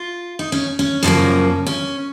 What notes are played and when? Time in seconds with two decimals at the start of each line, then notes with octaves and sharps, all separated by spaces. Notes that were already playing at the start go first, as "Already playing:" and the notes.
Already playing: F4
0.39 D#4
0.52 C#4
0.79 C#4
1.03 F#2 C#3 F3 A#3
1.67 C#4